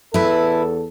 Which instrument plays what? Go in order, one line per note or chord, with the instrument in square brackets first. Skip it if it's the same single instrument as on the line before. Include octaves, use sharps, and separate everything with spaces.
[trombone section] E2 A4 [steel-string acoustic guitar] E4 B4